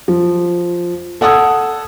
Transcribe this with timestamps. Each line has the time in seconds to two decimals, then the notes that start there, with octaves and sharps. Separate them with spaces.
0.08 F3
1.21 A4 F#5 A5 D#6 E6 G#6